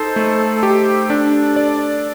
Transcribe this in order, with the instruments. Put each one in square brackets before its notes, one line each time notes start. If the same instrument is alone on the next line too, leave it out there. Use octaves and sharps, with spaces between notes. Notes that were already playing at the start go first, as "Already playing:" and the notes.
Already playing: [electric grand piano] D#4 C5 [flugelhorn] A4
[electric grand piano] A3
G4
[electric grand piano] D4 [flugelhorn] A4
[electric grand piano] D5